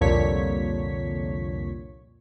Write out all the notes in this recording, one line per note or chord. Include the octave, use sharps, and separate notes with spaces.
C2 F2 A#2 D3 C#5 B6